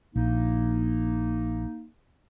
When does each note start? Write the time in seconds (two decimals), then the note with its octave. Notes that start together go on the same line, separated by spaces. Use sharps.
0.16 A#1 A#3 D#4